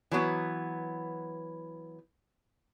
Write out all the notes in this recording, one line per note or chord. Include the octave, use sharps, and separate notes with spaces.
E3 F#3 B3